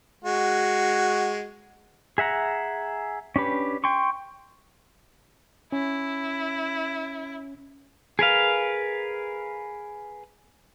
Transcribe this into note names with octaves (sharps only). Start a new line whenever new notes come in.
G#3 F#4
G#4 E5 F#5 A#5
C#4 D4 G4 B4
G5 C6 C#6
C#4 E4
G#4 A#4 B4 F5